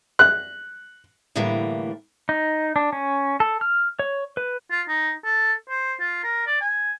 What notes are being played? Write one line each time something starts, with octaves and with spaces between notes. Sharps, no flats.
F#6
A2 D3 E3 G3 A#3
D#4
D4
C#4
A4
F6
C#5
B4
F4
D#4
A4
C5
F4
A#4
D5
G#5